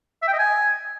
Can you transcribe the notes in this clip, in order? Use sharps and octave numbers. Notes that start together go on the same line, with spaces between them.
E5
G5
D#5
G#5